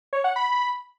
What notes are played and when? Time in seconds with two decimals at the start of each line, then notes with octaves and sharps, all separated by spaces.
0.13 C#5
0.24 F#5
0.36 B5